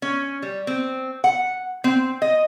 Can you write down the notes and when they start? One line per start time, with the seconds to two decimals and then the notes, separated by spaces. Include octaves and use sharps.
0.02 C#4
0.42 G3
0.67 C4
1.24 F#5
1.84 C4
2.22 D#5